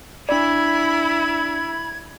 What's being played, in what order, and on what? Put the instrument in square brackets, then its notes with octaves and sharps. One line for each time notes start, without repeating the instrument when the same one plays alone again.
[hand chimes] D4 D5 [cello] E4 [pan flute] B5 [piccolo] G#6